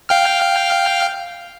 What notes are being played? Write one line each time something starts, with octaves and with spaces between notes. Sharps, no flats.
F5 G5 F6